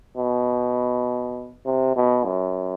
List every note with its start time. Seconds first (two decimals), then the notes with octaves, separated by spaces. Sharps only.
0.17 B2
1.66 C3
1.96 B2
2.25 F#2